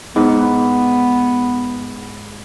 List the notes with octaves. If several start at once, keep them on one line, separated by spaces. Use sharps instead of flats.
G#2 B3